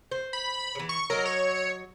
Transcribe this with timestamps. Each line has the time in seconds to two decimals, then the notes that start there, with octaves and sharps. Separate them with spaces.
0.12 C5
0.33 B5
0.75 C#3 E3
0.89 C#6
1.10 F#3 A#4 D#5
1.26 C#5